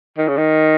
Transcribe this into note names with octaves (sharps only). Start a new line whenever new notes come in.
D#3
C#3
D#3